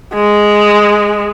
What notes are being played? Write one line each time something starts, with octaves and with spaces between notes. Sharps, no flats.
G#3